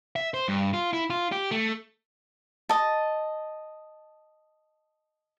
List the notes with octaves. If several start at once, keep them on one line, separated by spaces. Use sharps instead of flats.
E5
C5
G2
F4
E4
F4
G4
A3
D#5 A5